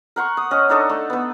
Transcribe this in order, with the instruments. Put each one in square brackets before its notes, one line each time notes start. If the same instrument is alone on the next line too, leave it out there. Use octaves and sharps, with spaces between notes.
[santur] A#4 F#5 C6 C#6
D#6
C#4 D#5
D4 D#4 A4 D#5
A3
B3 B4